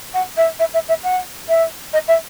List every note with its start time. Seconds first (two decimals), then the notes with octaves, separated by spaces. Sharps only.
0.14 F#5
0.37 E5
0.59 E5
0.74 E5
0.88 E5
1.03 F#5
1.49 E5
1.93 D#5
2.08 E5